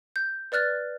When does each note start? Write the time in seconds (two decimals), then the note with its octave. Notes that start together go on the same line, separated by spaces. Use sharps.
0.16 G6
0.52 B4 D5 F6 F#6 A6